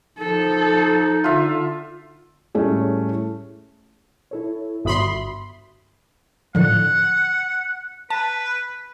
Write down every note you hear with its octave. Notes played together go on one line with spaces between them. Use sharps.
F3 D#4 A4
D3 F4 E5
A2 G3 A3 C#4 G#4
E4 A4 C#5
G1 F#4 E5 B5 C6 D#6
A2 D3 F3 F#5
B4 A5